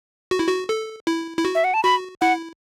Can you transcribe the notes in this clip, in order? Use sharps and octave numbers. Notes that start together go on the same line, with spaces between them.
F#4
E4
F#4
A4
E4
E4
F#4
E5
F#5
A5
F#4 B5
E4 F#5